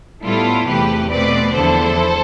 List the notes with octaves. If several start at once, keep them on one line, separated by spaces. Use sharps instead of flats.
A2 G3 B3 E4 F4 A4
E2 C3 E3 A3 G4 B4
B2 A3 C4 B4 D5
E2 D3 F3 B3 E4 A4 C5